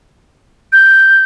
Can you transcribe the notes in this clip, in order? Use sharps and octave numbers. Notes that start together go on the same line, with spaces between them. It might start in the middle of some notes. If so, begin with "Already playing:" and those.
G6